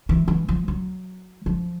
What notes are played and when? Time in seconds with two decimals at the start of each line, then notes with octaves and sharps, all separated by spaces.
0.09 E3
0.28 E3
0.49 F3
0.68 F#3
1.46 F3